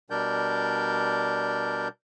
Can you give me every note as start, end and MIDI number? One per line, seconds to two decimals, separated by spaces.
0.10 1.88 47
0.10 1.88 55
0.10 1.88 62
0.10 1.88 70
0.10 1.88 74
0.10 1.88 91